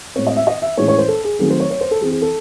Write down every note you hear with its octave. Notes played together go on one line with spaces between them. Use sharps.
A2 G#3 C4 C#5
D#5
E5
D#5
E5
A2 E3 G#3 C#4 C#5
C#5
C5
A4
G#4
D#3 F#3 A3 C4 G#4
C5
C#5
C#5
C5
A4
E3 C4 G#4
G#4
A4